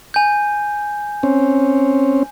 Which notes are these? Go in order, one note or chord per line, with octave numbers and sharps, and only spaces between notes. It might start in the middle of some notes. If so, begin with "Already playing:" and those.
G#5 G6
C4 C#4